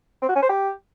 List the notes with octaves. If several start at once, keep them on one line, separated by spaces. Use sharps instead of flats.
C4
F#4
C#4
C5
G4